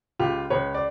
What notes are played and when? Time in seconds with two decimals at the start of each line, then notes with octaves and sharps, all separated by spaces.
0.19 C#2 F4 G4
0.50 C#2 B4 C#5
0.74 D5